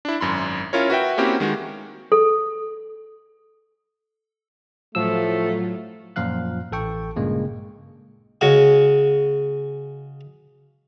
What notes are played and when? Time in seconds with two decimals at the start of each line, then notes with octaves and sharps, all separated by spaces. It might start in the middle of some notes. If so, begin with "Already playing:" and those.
0.05 D4 E4
0.21 G#1 F#2 B5 C6
0.73 C#4 E4 F4 A#4 C#5
0.90 F#4 B4 E5 G5
1.18 A#3 C4 C#4 E4 F#4 G4
1.40 D#3 G#3 F#4
2.12 A4
4.95 A2 F3 F#3 A3 F4 E6
6.16 F#2 A#2 F3 F5 F#6
6.72 A1 A4 G5 C#6
7.16 G2 A#2 C#3 G#3 A#3
8.41 C#3 G#3 F#4